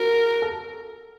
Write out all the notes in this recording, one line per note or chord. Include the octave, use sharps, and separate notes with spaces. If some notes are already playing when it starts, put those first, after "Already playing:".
Already playing: F#4 A#4
A4